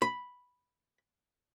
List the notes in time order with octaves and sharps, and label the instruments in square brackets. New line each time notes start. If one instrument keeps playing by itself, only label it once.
[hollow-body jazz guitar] B5